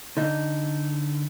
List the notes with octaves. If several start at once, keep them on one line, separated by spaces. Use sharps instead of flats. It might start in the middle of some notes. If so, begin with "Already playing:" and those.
D3 D#4